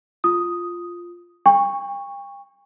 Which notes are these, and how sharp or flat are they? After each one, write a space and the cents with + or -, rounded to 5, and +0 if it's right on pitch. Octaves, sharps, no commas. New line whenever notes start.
F4 +0 D#6 +0
G5 +40 C#6 +0